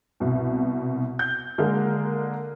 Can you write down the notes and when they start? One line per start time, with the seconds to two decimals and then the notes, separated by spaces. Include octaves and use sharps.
0.20 C2 B2
1.19 G6
1.58 D3 G#3 A#3 G#4 F6